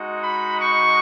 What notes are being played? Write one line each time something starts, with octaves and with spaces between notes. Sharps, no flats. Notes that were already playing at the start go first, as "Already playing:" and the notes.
Already playing: G#3 D#4 F#4
B5
C#6